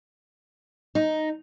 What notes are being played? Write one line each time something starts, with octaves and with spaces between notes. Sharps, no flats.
D#4